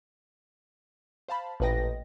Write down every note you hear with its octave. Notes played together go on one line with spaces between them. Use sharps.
C5 F5 A5 B5
A1 A#2 B4 D#5 G5 A#6